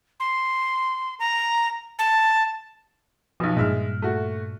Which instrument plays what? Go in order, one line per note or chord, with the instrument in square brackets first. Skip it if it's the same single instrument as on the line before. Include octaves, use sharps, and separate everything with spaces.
[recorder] C6
A#5
A5
[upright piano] B1 B2 [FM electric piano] F3
[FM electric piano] G2 A#2 [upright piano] G#3 E5 F6
[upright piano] A3 F#4